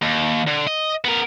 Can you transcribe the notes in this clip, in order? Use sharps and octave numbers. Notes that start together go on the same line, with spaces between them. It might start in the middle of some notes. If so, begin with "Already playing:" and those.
D#2
D3
D#5
B3 A#4